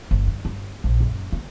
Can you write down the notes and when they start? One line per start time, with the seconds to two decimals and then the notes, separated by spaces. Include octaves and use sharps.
0.11 G1
0.27 G2
0.45 G1
0.84 A#1
1.00 F#1
1.32 A#3